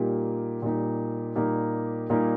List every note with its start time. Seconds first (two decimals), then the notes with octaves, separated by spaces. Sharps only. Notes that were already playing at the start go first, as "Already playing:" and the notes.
Already playing: A#2 G3 A#3 D#4 G4
0.62 A#2 G3 A#3 D#4 G4
1.36 A#2 G3 A#3 D#4 G4
2.09 A#2 G3 A#3 D#4 G4